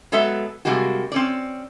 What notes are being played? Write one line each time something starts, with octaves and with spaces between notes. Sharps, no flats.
F#3 G#3 B3 A4 E5
C3 G3 G#3 A#3 F#4
C4 C#4 D5